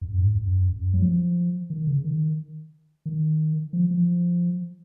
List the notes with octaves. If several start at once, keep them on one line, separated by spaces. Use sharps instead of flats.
F#2
G#2
F#2
F#2
F#3
F3
D#3
C#3
D#3
D#3
F3
F3